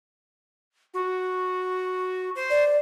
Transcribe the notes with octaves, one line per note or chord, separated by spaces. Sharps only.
F#4
C5
D5